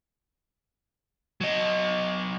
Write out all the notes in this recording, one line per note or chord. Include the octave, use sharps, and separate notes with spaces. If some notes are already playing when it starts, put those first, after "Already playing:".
F#3 D#5